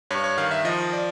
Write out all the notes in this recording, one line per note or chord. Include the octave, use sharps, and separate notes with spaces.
G2 C#5
C#5
D#3 F5
E5
F3 D#5
D5